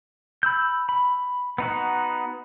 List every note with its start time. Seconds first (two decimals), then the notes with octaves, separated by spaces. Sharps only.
0.43 B5 E6 G6
0.89 B5
1.58 B3 D#4 F#4